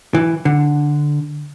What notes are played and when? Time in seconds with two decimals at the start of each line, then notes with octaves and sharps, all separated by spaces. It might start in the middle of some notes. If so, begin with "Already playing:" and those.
0.15 E3
0.45 D3